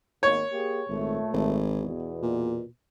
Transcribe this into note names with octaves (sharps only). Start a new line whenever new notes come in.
G#1 D#3 A#3 C#5
A#3 G4 G#4
G#1 A#2 A3
G#1
E2 B2
A#2